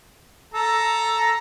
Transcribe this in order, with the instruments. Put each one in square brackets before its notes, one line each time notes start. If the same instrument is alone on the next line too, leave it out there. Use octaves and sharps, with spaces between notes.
[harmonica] A4 A#5